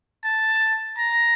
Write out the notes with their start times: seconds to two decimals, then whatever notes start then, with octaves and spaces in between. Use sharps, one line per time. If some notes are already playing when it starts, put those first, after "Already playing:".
0.24 A5
0.98 A#5